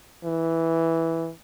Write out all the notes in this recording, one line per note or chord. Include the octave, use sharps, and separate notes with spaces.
E3